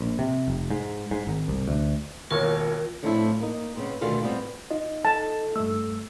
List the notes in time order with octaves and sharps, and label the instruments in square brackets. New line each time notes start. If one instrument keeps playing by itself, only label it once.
[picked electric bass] A#1
C3
F1
G#2
G#2
G#1
C2
D2
[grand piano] E1 D#2 C#5 [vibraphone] F4 A#4
[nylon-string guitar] A2 F3 A3 C4 D4 E4
A#3 D#4
C#3 B3 C4
D2 B2 D3 D#3 F4 F5
G3 B3 C4
[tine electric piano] D#4 D#5 [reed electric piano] F4
[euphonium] A4 [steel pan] A5
[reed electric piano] G2 A3 [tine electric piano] E6